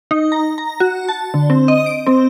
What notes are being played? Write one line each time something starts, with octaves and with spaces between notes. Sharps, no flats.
D#4
A#5
A#5
F#4
A5
D3
C4
D#5
D7
C4